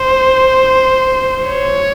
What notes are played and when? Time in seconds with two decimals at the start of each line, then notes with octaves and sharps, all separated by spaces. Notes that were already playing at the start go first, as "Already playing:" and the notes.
Already playing: C5
1.48 C#5